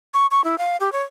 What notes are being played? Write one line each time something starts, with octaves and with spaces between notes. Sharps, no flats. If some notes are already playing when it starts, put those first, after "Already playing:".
C#6
C#6
E4
F5
G4
C#5